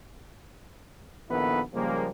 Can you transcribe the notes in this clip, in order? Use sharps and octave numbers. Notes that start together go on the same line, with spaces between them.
A#1 D#3 B3 E4 A4 B4
C#3 F3 G3 G#3 A#3